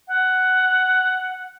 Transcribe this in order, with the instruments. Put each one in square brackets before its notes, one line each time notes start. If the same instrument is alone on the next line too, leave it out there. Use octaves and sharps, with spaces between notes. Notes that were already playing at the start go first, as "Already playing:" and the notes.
[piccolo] F#5